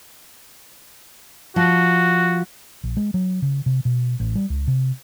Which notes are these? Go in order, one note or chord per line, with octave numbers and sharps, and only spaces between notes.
F3 F#4
A#1
G#3
F#3
C#3
C3
B2
A1
G3
C#2
C3